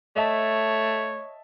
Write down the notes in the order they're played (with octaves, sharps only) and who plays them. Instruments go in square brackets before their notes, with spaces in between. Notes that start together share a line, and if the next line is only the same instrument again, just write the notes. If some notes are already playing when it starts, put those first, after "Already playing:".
[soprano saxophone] A3 [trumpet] C#5 [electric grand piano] D#5 E5 A5